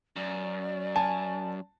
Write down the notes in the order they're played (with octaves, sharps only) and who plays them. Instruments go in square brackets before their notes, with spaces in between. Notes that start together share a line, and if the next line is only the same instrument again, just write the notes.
[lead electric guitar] F#2 [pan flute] D5
[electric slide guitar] G#5 [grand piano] A5